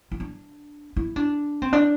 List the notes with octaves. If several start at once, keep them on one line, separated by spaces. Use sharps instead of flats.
E4
D4
E4
D4
C4
D4